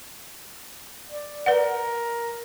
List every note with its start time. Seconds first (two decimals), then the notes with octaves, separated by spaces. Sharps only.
1.12 D5
1.46 A#4 B4 D5 F#5